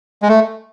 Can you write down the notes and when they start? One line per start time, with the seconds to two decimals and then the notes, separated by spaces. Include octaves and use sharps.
0.22 G#3
0.28 A3